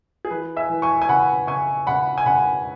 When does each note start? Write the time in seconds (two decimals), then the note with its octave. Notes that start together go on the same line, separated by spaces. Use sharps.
0.25 G#4
0.31 E3 B4
0.56 E5 G#5
0.70 E3
0.82 G#5 C#6
1.02 G#5
1.08 C#3 F#5 B5
1.47 C#3 G#5 C#6
1.87 C#3 F#5 B5
2.18 G#5
2.26 C#3 F#5 B5